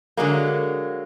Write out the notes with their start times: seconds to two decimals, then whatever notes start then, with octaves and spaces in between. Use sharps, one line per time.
0.17 D3 F#3 G#3 A#3